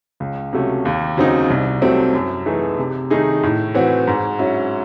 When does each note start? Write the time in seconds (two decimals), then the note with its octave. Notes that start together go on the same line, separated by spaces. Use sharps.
0.20 C#2
0.53 C3 F#3 A3 C#4
0.85 D#2
1.17 C#3 F#3 C4 D#4
1.50 C2
1.82 C3 F#3 A3 C4
2.13 F#2
2.46 E3 A3 D#4 G#4
2.79 C3
3.10 D#3 A3 D#4 G#4
3.43 A2
3.75 E3 C4 F#4
4.07 G#2
4.39 F#3 C#4 E4